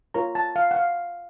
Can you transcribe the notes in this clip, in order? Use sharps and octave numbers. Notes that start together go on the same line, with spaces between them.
F4 A#4 C#5 A#5
A5
F5
F#5
F5